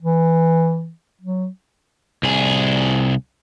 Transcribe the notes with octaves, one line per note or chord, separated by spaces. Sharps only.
E3
F#3
C2 G#4